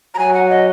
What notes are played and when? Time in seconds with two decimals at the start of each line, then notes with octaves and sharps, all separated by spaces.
0.15 A#5
0.18 F#3 G#5
0.34 F#5
0.50 D#5